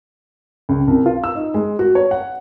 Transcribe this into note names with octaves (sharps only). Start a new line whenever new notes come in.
C#2
C2
F4
E6
D#4
G#3
F#4
C#5
F#5